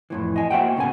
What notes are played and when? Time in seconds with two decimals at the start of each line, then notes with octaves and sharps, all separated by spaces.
0.10 F2 A2 E3
0.36 D#5 G#5
0.50 A#3 F#4 C5 E5 F#5 G5
0.76 D2 A2 C#3 B3 G#5